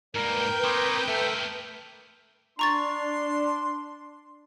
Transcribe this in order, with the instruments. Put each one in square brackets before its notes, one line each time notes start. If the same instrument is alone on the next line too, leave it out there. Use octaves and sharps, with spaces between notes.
[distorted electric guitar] G#2 A#3 [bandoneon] G3 [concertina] A#4 [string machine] B4 G5 G6
[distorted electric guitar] C4 C#5 [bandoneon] C6 D6 D#6
[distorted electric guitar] A3 A#4 [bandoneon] A4 E5
[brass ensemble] D4 [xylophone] A#5 C#6 A6 [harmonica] C6